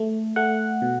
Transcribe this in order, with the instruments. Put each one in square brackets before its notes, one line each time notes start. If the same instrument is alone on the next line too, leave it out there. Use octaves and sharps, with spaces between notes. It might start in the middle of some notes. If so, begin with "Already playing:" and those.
Already playing: [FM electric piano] A3
A3 F#5
B2